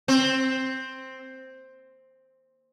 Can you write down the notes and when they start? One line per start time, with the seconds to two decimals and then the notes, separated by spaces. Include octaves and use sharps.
0.08 C4